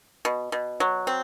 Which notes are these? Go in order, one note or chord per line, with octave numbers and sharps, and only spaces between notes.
B2
B2
F#3
C4